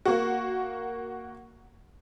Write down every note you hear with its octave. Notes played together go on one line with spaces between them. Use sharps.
A#3 F#4